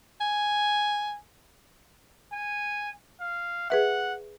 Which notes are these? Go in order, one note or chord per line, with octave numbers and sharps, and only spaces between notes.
G#5
G#5
F5
G#4 B4 E5 F#5